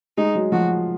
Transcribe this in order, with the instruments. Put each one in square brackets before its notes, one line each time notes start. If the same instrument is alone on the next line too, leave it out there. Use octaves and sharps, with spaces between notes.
[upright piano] G#3 [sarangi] D#4
[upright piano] F#3
[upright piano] F3 [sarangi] F#4